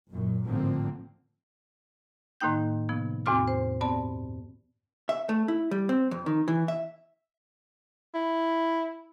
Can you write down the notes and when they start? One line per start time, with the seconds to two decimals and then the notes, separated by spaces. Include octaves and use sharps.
0.11 F#1 F#2 A#2
0.45 G#1 A2 D3 F3 A#3 C4
2.41 A2 D#3 A#3 D#4 G5 G6
2.89 C3 F3 B3
3.26 E2 A2 C4 F#4 D6 F6
3.48 C5
3.81 G2 B3 C4 D5 A5 B5
5.09 E5
5.29 A3
5.48 E4
5.71 G3
5.89 C4
6.11 F2
6.26 D#3
6.48 E3
6.68 E5
8.14 E4